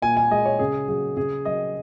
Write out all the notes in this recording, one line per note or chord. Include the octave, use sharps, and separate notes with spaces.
A#2 G#5
G#5
G#3 D#5
C#5
C#3 G#4
F#3 G#4
C#3 G#4
F#3 D#5